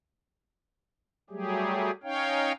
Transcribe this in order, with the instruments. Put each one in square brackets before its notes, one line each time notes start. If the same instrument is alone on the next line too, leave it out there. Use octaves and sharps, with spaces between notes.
[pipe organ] F#3 G3 A3 G4 G#4
C#4 D#4 C#5 F5 G5